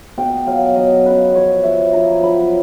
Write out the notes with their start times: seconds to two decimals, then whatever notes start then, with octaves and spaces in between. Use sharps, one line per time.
0.18 B2 G5
0.47 F#3 F5
0.76 F#3 D#5
1.06 C#3 B4
1.35 F3 C#5
1.63 F3 E5
1.93 F3 A#5
2.22 F#3 B5